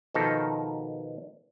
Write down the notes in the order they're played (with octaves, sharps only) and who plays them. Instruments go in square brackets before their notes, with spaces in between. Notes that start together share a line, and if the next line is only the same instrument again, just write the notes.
[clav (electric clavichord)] B2 D#3 F3 D#4 A4 A#4